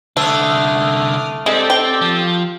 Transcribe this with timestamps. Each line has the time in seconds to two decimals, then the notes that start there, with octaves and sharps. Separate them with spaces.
0.17 C2 D3 A3 D6 D#6 F6
1.46 G#3 C4 G4 A4 D5
1.70 G5
2.01 F3